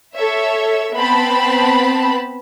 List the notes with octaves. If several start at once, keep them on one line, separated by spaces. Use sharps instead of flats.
A4 C#5 E5
B3 C4 A5 B5